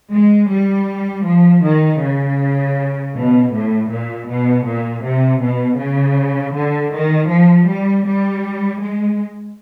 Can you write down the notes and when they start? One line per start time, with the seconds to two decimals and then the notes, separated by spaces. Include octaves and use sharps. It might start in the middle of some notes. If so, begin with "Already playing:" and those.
0.14 G#3
0.51 G3
1.26 F3
1.64 D#3
2.03 C#3
3.15 B2
3.53 A2
3.91 A#2
4.27 B2
4.66 A#2
5.03 C3
5.41 B2
5.78 C#3
6.54 D3
6.92 D#3
7.28 F3
7.66 G3
8.05 G3
8.80 G#3